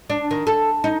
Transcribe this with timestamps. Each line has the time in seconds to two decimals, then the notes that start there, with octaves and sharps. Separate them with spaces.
0.10 D4
0.31 D#3
0.47 A4
0.84 D#4